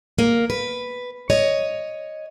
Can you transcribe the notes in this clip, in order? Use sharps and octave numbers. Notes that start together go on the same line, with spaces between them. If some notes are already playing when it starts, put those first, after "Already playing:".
A#3
B4
C#5 D#5